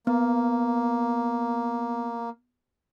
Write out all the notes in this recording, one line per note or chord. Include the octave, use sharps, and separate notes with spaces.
A#3 B3